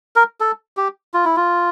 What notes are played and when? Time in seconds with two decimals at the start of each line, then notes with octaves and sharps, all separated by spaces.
0.16 A#4
0.40 A4
0.77 G4
1.14 F4
1.25 E4
1.36 F4